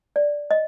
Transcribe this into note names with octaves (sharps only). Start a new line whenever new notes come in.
D5
D#5